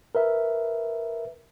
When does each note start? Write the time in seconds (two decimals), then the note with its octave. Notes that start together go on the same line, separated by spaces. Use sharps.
0.15 A#4 B4 E5